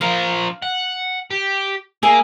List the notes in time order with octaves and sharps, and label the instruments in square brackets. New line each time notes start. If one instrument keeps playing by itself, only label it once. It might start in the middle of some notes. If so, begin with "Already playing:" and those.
[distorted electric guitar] F3 A#4 [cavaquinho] F5
[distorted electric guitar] F#5
G4
[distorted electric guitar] A#3 [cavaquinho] G#4 E5